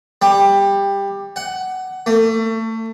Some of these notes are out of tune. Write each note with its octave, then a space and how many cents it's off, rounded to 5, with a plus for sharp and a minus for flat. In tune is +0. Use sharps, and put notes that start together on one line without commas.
G3 +15
F#5 +15
A3 +30